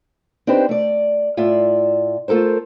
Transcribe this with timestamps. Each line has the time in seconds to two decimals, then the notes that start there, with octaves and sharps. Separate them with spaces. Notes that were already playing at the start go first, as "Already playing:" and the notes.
0.47 C4 D4 D#4 G4 B4 C5
0.69 A3 D5
1.37 A2 F4 D5 E5
2.28 A3 F4 A4 A#4 C5